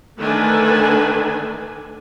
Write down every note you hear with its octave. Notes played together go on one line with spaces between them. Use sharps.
D3 D#3 A3 D4 B4 G#5